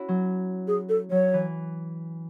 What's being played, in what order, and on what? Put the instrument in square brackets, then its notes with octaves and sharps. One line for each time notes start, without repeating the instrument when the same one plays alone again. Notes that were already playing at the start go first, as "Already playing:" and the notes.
Already playing: [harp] C#4 E4 F#4
F#3
[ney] G#4
A4
[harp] F#3 [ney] C#5
[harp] E3